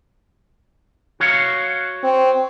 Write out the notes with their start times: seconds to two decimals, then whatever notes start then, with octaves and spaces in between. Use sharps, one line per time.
1.20 F#4 C#5 F5
2.04 C4